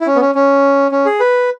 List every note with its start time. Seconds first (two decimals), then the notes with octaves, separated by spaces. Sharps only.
0.01 E4
0.07 C#4
0.16 B3
0.22 C#4
0.35 C#4
0.91 C#4
1.06 G#4
1.20 B4